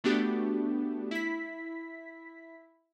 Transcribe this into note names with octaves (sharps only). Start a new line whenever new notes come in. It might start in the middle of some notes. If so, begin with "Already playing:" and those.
A3 B3 D4 F#4 G4
E4 B6